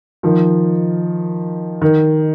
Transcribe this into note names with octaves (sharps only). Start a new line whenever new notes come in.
D#3 F3
D#3